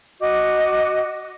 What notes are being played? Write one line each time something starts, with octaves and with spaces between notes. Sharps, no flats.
F#4 D#5 D6